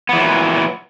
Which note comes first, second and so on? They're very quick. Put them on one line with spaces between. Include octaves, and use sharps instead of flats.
B3 E3 F#3 A#2